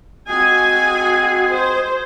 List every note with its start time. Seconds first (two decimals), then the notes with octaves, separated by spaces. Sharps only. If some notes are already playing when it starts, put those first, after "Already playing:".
0.28 G#3 C4 F#4 G#4 G#5
1.52 C5